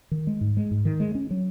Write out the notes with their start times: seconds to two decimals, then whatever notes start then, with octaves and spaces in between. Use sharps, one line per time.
0.11 D#3
0.27 G#3
0.41 G#2
0.57 G#3
0.71 G#2
0.85 D#3
1.00 G#3
1.15 C#4
1.31 F#3